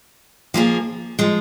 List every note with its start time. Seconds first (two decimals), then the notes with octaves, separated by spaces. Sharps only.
0.54 F3 A#3 F4 G#4
1.19 F3 G#3